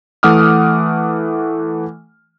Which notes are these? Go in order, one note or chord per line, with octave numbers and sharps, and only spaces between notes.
E3 A3 F#5 D6 D#6 F6